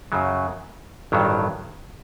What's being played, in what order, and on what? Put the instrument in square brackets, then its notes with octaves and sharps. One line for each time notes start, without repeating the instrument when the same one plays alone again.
[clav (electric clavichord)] F#2 C#3 F#3
A1 G2 D#3 F#3